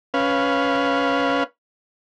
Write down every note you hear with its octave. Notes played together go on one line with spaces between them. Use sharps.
C#4 B4 F5